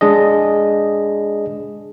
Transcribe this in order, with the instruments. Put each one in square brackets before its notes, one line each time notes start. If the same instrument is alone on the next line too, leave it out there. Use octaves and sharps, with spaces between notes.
[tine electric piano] G#3 D4 G#4 D#5